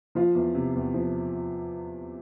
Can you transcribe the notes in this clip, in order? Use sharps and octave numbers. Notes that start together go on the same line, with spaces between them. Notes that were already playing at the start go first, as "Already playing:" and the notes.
F3 F4
E2
C3
E2
F3